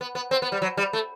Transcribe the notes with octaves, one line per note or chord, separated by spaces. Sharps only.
B3
B3
C4
B3
G3
F#3
G3
A3